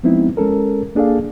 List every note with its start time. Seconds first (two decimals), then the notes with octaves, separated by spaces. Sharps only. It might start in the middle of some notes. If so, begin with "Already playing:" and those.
0.03 F3 G#3 B3 C4 D#4 E4
0.37 G#3 C#4 A4 A#4
0.95 A#3 D4 G#4 A4 D5 F5